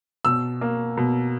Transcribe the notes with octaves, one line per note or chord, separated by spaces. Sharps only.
B2 E6
A#3
B2